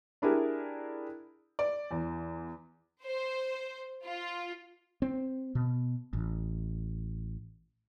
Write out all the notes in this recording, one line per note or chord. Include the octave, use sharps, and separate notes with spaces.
D4 E4 G4 G#4 A#4
D5
E2
C5
F4
C4
B2
A1